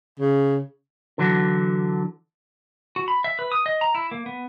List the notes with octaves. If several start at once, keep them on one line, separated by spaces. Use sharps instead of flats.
C#3
D3 E3 F#3
F#4
B5
E5
B4
D#6
D#5
A#5
E4
A#3
B3